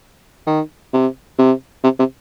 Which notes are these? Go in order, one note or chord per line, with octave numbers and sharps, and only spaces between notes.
D#3
C3
C3
C3
C3